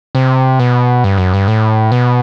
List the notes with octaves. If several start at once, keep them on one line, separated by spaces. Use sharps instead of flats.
C3
B2
G2
F#2
G2
A2
B2